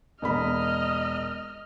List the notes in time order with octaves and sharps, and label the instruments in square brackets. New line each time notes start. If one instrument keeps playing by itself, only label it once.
[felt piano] E1 A#3 B5 [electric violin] D#5 F6